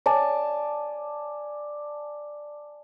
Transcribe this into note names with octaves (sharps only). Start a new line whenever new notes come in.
D5 G#5 A5